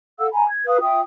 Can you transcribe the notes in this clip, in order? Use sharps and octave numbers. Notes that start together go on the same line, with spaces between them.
A4 F5 F#5 E6
G#5 A#5 B5
G#6
B4 F5 D#6
F4 E5 G5 D#6